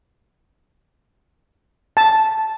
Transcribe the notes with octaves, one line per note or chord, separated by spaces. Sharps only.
A5